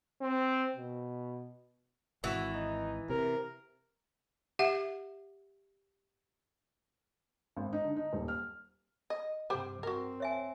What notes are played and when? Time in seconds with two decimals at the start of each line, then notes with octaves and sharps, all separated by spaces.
0.21 C4
0.76 B2
2.24 G#1 E3 F#4
2.54 D#4
3.10 C3 A#4
4.59 G4 E5 F#5
7.57 G#1
7.73 D#4
7.84 D3
7.96 D#4
8.13 D#1
8.28 F6
9.10 D#5
9.50 G2 C3 G4 C5 G5
9.83 C4 F#4 A#4
10.20 C#5 E5 G#5